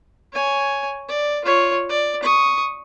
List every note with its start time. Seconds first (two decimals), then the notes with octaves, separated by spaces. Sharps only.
0.32 C#5 G#5
1.08 D5
1.44 F4 C#5
1.89 D5
2.23 C#6 D#6